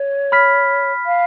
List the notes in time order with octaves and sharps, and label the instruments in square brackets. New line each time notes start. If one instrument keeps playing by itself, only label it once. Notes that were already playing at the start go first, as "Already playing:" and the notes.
Already playing: [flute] C#5
[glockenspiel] B5 F6 B6
[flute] F5